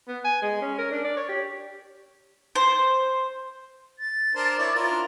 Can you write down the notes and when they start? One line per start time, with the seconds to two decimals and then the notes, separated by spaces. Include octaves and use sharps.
0.08 B3
0.24 G#5
0.42 G#3
0.61 C#4
0.78 A#4
0.91 D4
1.04 D5
1.17 C#5
1.29 G4
2.55 C5
3.99 A6
4.35 D4 A#4 C5
4.59 E4 C#5 D5
4.75 E4 F4 A#4
4.91 D4